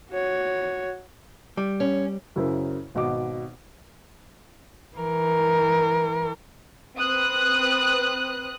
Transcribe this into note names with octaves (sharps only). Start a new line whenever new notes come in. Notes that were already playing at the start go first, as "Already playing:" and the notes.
F#4 C#5
G3
C#4
F#2 C#3 E4 A#4 C5
G#1 B2 D#5 D6
E3 A#4
C4 B4 D#6 F#6